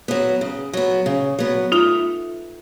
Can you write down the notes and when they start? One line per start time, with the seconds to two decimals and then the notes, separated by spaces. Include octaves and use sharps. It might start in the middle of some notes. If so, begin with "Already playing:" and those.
0.08 F#3 B3
0.41 C#3
0.73 F#3 B3
1.06 C#3
1.39 F#3 B3
1.72 A3 D#4 F4